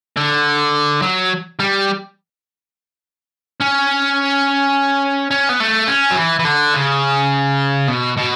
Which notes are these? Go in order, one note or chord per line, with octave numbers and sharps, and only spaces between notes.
D3
F#3
G3
C#4
C#4
B3
A3
C#4
F#3
E3
E3
D3
C#3
B2
B2